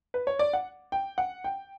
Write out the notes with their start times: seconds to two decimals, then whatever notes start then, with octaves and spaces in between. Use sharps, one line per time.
0.14 B4
0.27 C#5
0.39 D5
0.53 F#5
0.92 G5
1.18 F#5
1.44 G5